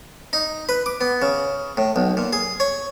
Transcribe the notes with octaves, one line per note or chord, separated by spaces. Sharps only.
D#4
B4
D6
B3
C#3
A2
B1
A#2
G#4
C#5